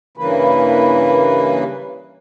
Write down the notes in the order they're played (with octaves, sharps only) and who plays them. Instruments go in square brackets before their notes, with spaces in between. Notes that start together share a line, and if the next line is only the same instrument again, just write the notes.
[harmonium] G2 C#3 E3 A#3 B4